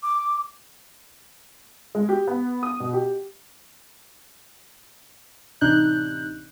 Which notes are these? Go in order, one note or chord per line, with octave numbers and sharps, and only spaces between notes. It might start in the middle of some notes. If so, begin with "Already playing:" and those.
D6
G#3
G4
B3
D#6
B2
G4
A1 C3 D4 D#4 F#6 G6